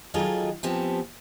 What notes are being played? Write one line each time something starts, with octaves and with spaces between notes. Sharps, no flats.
D#3 F#3 F4 G#4 A4 D#5
F3 B3 C4 G4 G#5 A5